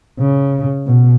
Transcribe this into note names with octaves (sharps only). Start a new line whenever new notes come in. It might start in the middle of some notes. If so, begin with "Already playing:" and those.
C#3
B2